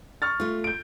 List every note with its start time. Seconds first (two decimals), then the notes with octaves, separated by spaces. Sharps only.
0.22 C#6 F6 A6
0.40 A3 F4
0.64 G6 D7